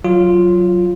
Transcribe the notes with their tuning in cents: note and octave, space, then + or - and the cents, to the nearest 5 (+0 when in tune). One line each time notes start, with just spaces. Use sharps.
F#3 +0 F4 +0